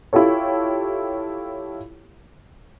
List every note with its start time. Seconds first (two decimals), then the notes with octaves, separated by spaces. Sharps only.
0.13 E4 F4 G4 A4 C#5